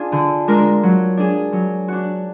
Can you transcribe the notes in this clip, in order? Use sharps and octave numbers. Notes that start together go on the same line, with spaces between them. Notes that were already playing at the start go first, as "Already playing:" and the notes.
Already playing: D4 F4 G#4
D3
G#3 D4 F4 A#4
F#3
D4 G#4
F#3
D4 F#4